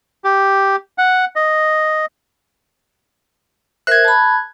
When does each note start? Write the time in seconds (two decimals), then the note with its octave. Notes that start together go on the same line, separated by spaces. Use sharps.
0.24 G4
0.98 F#5
1.36 D#5
3.87 A#4 C5 E5 F#6 G#6
4.05 A5 B5